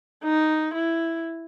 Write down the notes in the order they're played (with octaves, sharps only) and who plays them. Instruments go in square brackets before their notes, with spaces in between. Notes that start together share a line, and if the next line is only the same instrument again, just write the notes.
[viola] D#4
E4